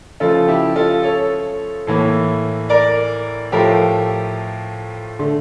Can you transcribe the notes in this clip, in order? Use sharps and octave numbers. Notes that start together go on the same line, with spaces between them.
C#3 F3 A3 F4 A4
E4 G4
F4 A4
A4 C#5
A2 E3 A#3
A#4 D5
A2 F3 A3 G4 A#4
D3 A3